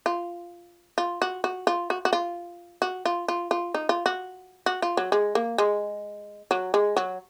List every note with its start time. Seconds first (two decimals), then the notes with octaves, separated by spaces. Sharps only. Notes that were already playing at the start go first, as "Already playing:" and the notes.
0.06 F4
0.98 F4
1.22 F#4
1.44 F#4
1.67 F4
1.90 F#4
2.05 F#4
2.13 F4
2.82 F#4
3.05 F4
3.28 F4
3.51 F4
3.74 D#4
3.89 F4
4.06 F#4
4.66 F#4
4.82 F4
4.97 F#3
5.12 G#3
5.35 A#3
5.58 G#3
6.51 F#3
6.74 G#3
6.97 F#3